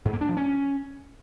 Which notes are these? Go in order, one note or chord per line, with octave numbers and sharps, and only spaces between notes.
G#2
A#3
D4
F3
C#4